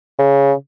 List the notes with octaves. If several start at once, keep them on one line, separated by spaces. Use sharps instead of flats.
C#3